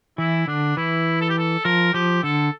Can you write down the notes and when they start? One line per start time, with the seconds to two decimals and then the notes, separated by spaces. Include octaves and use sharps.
0.18 E3 E4
0.47 D3 D4
0.77 E3 E4
1.21 A4
1.30 G4
1.38 A4
1.65 F3 A#4
1.94 F3 G4
2.23 D3 A4